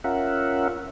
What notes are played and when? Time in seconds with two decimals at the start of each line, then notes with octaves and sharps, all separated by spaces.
0.04 C#4 F4 A#4 E5 F#5